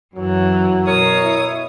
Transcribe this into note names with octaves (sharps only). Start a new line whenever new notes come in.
F#2 E3 F#3
B2 A#4 C#5 D#6
E4